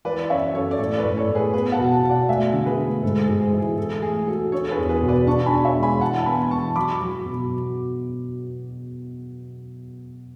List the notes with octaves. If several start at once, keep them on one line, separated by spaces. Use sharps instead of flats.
E3 B4 D5
F#2 C#5 E5
F#2 A4 C#5
D5
A2 A4 C#5
B4 D5
A2
A4 C#5
A2
G#4 B4
B3 G#4 B4
F#5 A5
B2
F#5 A5
B2
D5 F#5
A3 E5 G#5
D3
G#4 B4
A3
G#2 A4
G#4
G#2
G#4
E3
G#4
E3 A4
A3 G#4
F#4 A4
D4 A4 C#5
G#4 B4
E2
G#4 B4
B2
B4 D5
D4 A5 C#6
G#5 B5
D4
C#5 E5
G#3
G#5 B5
E3 F#5 A5
B3 G#5 B5
E3 A5 C#6
F#3 B5 D6
F#3
B2